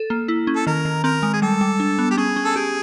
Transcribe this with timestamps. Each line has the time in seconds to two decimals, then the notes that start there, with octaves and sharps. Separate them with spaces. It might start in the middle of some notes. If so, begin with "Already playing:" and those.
Already playing: A4
0.10 A#3
0.28 E4
0.47 C#4
0.56 A4
0.67 D#3 A#4
0.85 D#3
1.04 C4 A#4
1.23 G#3
1.33 G#4
1.42 G3 A4
1.61 G3
1.80 D4
1.98 B3
2.11 G4
2.17 C#4 G#4
2.36 C#4
2.45 A4
2.56 G4 G#4